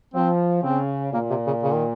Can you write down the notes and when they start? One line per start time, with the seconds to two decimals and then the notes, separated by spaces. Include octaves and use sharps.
0.14 F3 C4
0.63 C#3 C4
1.13 A#2 A#3
1.30 C3
1.47 C#3
1.63 C#3
1.74 D#3